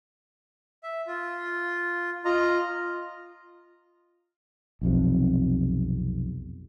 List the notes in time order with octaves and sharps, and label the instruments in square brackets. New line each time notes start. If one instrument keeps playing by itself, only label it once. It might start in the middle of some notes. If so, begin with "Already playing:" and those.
[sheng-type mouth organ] E5
F4
[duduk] F4 [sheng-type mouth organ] D#5 A#5
[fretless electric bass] B1 F2 C3